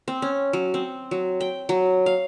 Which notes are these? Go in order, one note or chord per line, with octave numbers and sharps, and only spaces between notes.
C4
C#4
F#3
C4
F#3
G5
F#3
F5